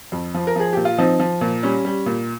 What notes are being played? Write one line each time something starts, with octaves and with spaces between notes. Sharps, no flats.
F2
F3
A#4
F3 G#4
A#2 G4
F4
F3 C4 D#4
F3
A#2
G3 C#4
G3
A#2